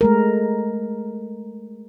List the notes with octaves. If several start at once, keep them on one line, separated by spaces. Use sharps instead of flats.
G#3 A3 A#4